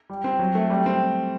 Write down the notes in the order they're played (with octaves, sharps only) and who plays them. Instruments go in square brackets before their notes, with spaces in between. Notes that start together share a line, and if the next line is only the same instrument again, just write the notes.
[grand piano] G3
C4
F#3
A3
G3
C4